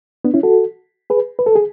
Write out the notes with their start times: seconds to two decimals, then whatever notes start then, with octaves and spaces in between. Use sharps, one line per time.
0.25 B3 D4
0.34 C#4 E4
0.43 F#4 A4
1.10 G#4 B4
1.39 B4
1.46 A4
1.56 G#4